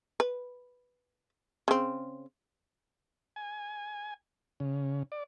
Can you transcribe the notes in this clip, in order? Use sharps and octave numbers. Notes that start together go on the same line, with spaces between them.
B4
C#3 C4
G#5
C#3
D5